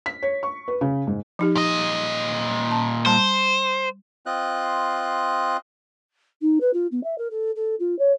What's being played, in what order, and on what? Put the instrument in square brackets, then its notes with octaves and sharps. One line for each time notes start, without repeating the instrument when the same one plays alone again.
[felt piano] B6
C#5
C#6
B4
C#3
G#2
[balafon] F3 D#4 G4
[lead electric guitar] A#2 D#5
[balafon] A5
[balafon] G3 A5 [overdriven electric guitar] C5
[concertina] C4 F4 D#5 F#6
[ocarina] D#4
B4
F4
B3
E5
A#4
A4
A4
F4
C#5